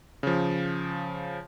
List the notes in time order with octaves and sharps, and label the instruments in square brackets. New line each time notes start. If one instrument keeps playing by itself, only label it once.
[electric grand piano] C#3 F3